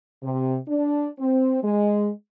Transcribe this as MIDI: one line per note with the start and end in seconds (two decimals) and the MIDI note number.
0.23 0.58 48
0.68 1.10 62
1.19 1.59 60
1.63 2.10 56